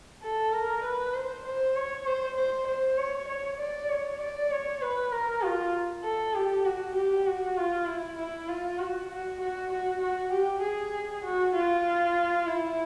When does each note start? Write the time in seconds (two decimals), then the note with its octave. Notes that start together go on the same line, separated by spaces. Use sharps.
0.23 A4
0.53 A#4
0.84 B4
1.14 C5
1.45 C5
1.76 C#5
2.06 C5
2.37 C5
2.67 C5
2.98 C#5
3.28 C#5
3.59 D5
3.90 C#5
4.21 D5
4.51 C#5
4.82 B4
5.12 A#4
5.43 F4
6.04 A4
6.35 G4
6.65 F#4
6.96 G4
7.26 F#4
7.57 F4
7.88 E4
8.18 E4
8.49 F4
8.79 F#4
9.10 F#4
9.41 F#4
9.71 F#4
10.01 F#4
10.33 G4
10.63 G#4
11.24 F#4
11.55 F4
12.47 E4